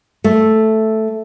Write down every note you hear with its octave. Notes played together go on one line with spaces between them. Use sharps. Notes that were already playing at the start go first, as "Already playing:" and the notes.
A3